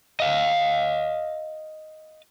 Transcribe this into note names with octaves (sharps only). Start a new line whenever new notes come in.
D#5 F5